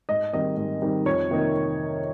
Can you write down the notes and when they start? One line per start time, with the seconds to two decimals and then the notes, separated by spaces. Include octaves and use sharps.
0.09 G#2 D#5
0.33 D#3 G3 C4 D#4 D#5
0.57 G#2
0.82 D#3 G3 C4 D#4
1.06 F2 C#5
1.31 C3 D#3 A#3 D#4